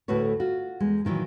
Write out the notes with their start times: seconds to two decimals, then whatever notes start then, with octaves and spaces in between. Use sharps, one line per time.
0.08 D2 A2 A3 F#4 B4 C#5
0.40 F4 F#4
0.80 E2 G#3
1.05 A#2 D#3 E3 F#3